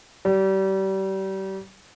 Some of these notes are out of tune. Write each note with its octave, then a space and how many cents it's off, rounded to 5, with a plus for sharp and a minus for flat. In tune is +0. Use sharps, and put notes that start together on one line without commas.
G3 -30